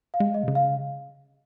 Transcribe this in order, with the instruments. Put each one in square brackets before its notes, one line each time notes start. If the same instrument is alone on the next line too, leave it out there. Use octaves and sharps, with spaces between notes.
[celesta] F5
[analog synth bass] G#3
[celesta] D#5
[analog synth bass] C3
C#3
[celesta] F5